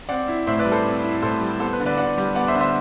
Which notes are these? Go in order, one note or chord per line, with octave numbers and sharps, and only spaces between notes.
C4 D5 F#5
E4
A2 C5 E5
B4 D5
G3
A4 C5
C4
E4
A2 A4 C5
G3
B3 A4 C5
B4
D3
B4 D5
D3 D5 F#5
G3
B3 D5 F#5
C5 E5
D3
C5 E5